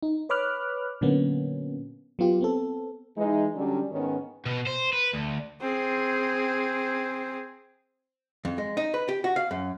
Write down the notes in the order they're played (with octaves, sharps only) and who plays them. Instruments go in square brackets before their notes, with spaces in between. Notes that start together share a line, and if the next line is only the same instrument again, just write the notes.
[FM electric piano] D#4
B4 C#5 B5 D6 F6 F#6
A#2 D3 F#3 A#3 B3 C#4
F#3 B3 F4 G4
B3 C4 A4
[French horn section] E3 G#3 D#4
D3 F#3 G3 C#4 D4
G#2 D#3 B3 C#4
[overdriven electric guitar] B2
C5
B4
D2
[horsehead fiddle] C4 G#4
[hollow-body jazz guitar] F2
G#3
D#4
B4
G4
F#4
F5
F#2